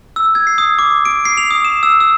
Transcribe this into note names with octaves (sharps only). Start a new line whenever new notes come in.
E6
G#6
C7
D#6
D6
D7
C7
F7
D#6
E7
E6
E6